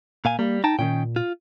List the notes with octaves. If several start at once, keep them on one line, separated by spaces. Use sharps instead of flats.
A#2 F5 G#5
G3 A#3
D#4 G5 A5 A#5
A#2 D#3 C#4 G5
F4